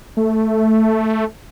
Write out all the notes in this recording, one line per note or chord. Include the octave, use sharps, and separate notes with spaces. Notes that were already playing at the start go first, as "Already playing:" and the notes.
A3